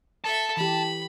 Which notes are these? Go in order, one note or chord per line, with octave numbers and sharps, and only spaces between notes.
A4 E5 A5
E3 G4 B5